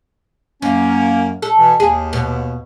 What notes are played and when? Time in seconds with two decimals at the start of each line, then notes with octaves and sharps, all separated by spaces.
0.62 F#2 A#3 C#4
1.42 A4
1.58 B2 E3
1.80 D#2 G#4
2.13 B2